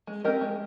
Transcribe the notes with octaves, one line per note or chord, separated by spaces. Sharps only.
G#3
C4 G4 A#4 D#5
G#3